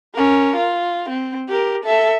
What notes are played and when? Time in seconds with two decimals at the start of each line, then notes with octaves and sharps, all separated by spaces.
0.14 C#4 A#4
0.57 F4
1.09 C4
1.49 G4 A#4
1.85 A4 E5